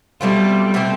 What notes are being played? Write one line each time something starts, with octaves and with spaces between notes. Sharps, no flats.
B2 G3 A3 C4 F4
B2 A3 C4 G4